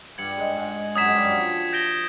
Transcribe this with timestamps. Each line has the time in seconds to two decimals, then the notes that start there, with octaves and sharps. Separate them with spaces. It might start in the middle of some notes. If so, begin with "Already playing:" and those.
0.18 G2 G3 G#6 C#7 F#7
0.38 G#2 G#3
0.56 G#2 G#3
0.95 F#2 F#3 D#6 G#6 B6 E7
1.05 G#2 G#3
1.15 G2 G3
1.24 F#2 F#3
1.34 F3
1.73 G6 A#6 D7 G7